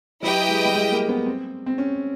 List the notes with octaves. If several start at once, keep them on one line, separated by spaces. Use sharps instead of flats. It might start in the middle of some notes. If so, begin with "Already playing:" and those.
F#3 E4 G4 B4 D#5 G5
G#3
G3
G#3
A#3
B3
C4
C4
C#4